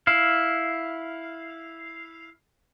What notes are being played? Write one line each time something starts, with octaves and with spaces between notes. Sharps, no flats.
E4 F5